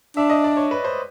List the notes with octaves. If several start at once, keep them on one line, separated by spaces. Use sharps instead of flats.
D4 E5
D#5
D5
C#5
B4
C5